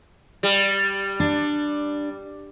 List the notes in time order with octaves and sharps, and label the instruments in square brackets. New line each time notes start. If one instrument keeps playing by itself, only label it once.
[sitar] G3
[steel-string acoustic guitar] D4